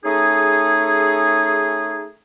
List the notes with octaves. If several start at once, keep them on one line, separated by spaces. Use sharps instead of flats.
A3 C#4 D#4 G#4